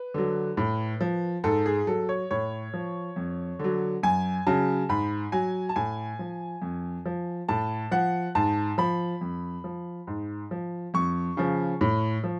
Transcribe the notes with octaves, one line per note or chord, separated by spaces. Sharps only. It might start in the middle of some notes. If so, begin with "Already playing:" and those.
Already playing: B4
D3 F#3
A2
F3
G#2 A4
G#4
F#3 A4
C#5
A2 C#5
F3
F2
D3 F#3
F#2 G#5
C#3 F#3 A5
G#2 B5
F#3 G#5
A5
A2 G#5
F3
F2
F3
A2 A5
F3 F#5
G#2 A5
F3 B5
F2
F3
G#2
F3
F2 C#6
C#3 F3
A2
F3